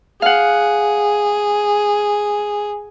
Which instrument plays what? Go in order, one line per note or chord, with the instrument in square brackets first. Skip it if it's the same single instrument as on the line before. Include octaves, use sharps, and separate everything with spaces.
[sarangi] G#4 [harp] F5 F#5